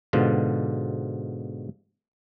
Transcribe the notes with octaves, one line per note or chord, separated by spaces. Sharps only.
G#2 B2 D3 F4